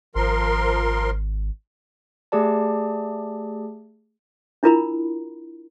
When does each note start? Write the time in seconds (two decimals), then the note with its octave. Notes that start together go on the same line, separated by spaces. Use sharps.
0.15 G#1 F3 A#4 C6
2.32 A3 G4 G#4 D5 A5
4.63 D4 E4 F4 A#4 A#5 B5